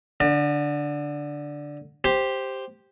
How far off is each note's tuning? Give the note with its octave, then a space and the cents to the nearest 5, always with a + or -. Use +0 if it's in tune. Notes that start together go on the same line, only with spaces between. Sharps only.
D3 -5 D5 +45
G4 +0 C5 +0